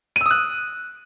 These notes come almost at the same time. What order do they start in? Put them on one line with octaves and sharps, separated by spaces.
D#7 E6 D#6 F#6